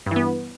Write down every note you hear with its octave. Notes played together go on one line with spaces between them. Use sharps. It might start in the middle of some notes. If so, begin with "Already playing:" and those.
G2 E3 B3